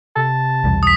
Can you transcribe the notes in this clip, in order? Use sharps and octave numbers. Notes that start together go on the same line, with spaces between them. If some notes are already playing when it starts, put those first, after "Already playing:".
C3 A5
B1 E2 G3
D#6 B6